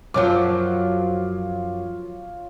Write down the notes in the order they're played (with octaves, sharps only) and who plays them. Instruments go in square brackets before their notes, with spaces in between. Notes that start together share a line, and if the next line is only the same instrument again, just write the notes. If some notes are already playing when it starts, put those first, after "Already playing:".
[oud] F#2 F3 F#3 [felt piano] F4 C#5 D6